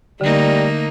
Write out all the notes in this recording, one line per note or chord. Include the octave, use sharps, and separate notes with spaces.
D3 G3 A3 A#3 D#4